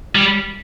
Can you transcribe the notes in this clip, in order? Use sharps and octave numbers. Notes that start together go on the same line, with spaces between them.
G3